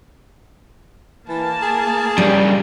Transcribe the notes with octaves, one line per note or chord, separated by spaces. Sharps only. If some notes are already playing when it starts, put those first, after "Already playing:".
E3 A#3 A#4 A5
G#4
G2 C#3 G3